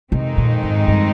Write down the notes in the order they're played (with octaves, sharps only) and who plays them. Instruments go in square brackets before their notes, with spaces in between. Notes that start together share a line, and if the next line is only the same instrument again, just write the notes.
[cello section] F2 D#3 G#3 C4 D#4 [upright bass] C3
[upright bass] A#2
G#2
G2